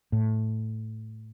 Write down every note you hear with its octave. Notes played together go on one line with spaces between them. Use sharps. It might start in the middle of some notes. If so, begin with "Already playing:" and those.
A2